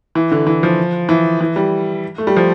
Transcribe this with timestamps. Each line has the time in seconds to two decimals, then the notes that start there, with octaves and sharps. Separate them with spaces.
0.15 E3
0.31 D3
0.47 E3
0.63 F3
1.09 E3
1.41 E3
1.56 G3
2.18 A3
2.27 G3
2.37 F3